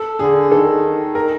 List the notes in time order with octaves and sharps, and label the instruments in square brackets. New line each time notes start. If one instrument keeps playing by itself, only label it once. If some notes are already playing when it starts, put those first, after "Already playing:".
Already playing: [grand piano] A4
[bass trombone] D3 [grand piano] G#4
[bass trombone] D#3 [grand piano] A4
[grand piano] A#4